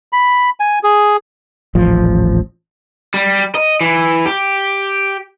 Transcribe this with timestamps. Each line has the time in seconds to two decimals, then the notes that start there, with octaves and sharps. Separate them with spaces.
0.13 B5
0.60 G#5
0.83 G#4
1.75 D#1 A1 F3
3.14 G3
3.55 D#5
3.81 E3
4.26 G4